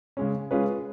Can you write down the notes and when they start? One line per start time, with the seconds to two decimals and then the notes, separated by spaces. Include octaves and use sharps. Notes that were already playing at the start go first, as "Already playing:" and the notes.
0.17 C#3 G#3 C#4
0.51 G#3 C#4 F4 G#4 B4